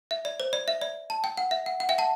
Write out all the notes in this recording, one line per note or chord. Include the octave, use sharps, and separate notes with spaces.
E5
D5
C5
D5
E5
D5
A5
G5
F#5
E5
F#5
F#5
E5 G5
F#5 A5